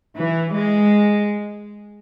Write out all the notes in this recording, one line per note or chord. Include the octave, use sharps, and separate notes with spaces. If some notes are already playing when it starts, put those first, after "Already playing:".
E3
G#3